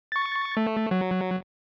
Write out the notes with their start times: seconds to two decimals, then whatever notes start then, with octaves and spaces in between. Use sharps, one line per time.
0.12 C#6 A6
0.57 A3
0.91 F#3